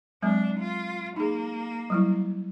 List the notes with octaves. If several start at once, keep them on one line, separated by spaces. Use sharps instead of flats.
F#3 G#3 C4 D4
F4
A#3 D#4 G#4
F#3 G3 E4